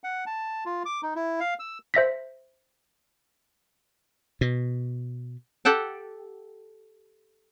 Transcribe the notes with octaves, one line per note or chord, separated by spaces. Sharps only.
F#5
A5
F4
D6
D#4
E4
F5
E6
C5 E5 A#6 B6
B2
G4 A4 F#5 G5 A5